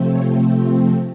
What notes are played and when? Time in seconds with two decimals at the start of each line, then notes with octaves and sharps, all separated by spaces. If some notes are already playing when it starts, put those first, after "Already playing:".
Already playing: C3 F3 A3 C4
0.10 C#5